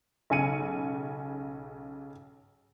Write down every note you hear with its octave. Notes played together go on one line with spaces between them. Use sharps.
B1 C#3 G#5 C#7 D#7